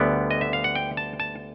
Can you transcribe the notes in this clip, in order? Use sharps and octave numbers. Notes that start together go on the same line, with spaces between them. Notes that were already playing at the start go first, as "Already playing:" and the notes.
Already playing: D2 D3 G3 B3 D5
D#5
E5
F5
F#5
G5
A5
A5